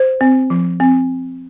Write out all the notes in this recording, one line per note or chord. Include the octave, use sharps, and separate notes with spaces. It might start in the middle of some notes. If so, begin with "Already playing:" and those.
Already playing: C5
C4
F3
C4